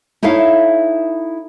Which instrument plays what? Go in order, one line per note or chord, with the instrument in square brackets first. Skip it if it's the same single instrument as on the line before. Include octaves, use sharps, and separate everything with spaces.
[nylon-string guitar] D#4 E4 A4 C#5 E5 F5